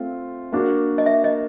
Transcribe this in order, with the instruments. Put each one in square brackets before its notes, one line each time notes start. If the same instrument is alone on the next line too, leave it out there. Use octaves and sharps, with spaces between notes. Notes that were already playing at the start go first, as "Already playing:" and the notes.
Already playing: [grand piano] A3 C4 F4
A#3 D4 F#4
[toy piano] D#5
E5
D#5